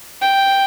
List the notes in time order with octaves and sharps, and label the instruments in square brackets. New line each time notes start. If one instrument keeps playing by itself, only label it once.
[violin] G5